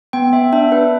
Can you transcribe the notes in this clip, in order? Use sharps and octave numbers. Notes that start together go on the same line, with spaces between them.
B3 G5
B3 E5
D4 E5
D4 B4